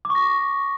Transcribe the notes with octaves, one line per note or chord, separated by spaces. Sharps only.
D6
C#6
A#6